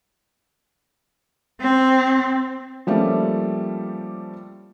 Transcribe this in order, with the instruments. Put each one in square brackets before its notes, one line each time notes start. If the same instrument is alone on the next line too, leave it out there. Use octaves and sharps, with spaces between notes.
[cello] C4
[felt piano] F3 G3 A3 A#3 C#4 G4